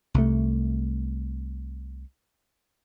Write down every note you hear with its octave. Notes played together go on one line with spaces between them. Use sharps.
C2 A3